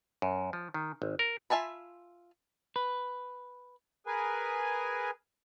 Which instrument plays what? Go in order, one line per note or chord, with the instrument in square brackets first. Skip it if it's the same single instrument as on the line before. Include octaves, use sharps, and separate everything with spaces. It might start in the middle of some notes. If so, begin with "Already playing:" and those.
[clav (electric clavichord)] F#2
F3
D#3
G#1
A#4
[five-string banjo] F4 E5 G#5 A5 B5
[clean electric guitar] B4
[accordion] G#4 A#4 B4 G#5